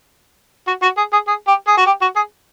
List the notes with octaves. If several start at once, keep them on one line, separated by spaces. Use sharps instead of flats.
F#4
F#4
G#4
G#4
G#4
G4
G#4
F#4
G4
F#4
G#4